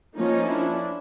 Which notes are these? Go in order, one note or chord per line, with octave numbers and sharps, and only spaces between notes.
F3 A#3 C#4 D#4
D4 E4